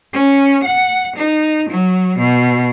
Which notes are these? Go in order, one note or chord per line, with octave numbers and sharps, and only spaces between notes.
C#4
F#5
D#4
F#3
B2